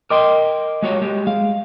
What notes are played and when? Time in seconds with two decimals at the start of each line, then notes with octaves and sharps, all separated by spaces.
0.10 A#4 D#5 G5 C6 D6
0.82 G#3 F#4 C#5
1.02 G#3 G4
1.27 G#3 F5